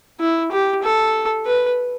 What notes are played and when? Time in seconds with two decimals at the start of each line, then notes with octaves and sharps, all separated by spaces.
0.20 E4
0.52 G4
0.83 A4
1.46 B4